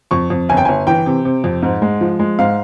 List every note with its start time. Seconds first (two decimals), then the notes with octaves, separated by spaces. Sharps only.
0.11 F2 C#6
0.30 F2
0.49 G1 G#5
0.57 G5
0.65 G1 G#5
0.87 E3 G5
1.06 C3
1.25 C3
1.44 F2
1.62 G#2
1.82 G#3
2.01 F3
2.19 G#3
2.39 G#2 F5